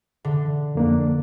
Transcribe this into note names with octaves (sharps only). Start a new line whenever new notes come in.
D3
F2 A#3 D4